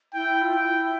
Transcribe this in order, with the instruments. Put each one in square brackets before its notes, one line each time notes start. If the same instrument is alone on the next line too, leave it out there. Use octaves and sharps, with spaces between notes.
[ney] E4 [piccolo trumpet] G5
[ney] F4
[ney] E4 [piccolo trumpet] G5